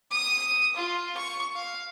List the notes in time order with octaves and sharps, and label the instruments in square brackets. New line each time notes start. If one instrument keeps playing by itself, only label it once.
[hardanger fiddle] D#6
F4
C#6
F5